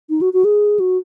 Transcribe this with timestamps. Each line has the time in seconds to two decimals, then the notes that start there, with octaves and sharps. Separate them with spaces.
0.10 D#4
0.21 F#4
0.33 F#4
0.45 G#4
0.80 F#4